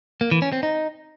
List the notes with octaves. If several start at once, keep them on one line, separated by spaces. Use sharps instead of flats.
A#3
E3
C#4
C4
D#4